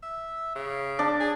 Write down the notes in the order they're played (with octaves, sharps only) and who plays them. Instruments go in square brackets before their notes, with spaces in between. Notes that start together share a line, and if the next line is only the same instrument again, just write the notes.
[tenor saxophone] E5
C#3
[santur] D4
[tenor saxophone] G#4